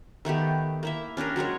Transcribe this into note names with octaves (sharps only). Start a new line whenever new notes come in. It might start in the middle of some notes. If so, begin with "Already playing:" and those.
D#3 A3 B3 G4
A#3 E4 E5
C#4 D4 G4 A#4
F#3 G#3 A#4 C#5